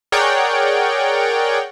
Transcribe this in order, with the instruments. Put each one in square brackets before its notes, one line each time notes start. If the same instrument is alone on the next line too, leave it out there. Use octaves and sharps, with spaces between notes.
[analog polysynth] G#4 A#4 C#5 D5 F#5 G5